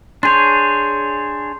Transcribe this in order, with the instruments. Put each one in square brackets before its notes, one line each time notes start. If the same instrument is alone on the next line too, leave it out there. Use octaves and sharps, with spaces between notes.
[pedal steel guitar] D4 G#4 C#5 [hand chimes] C6 G6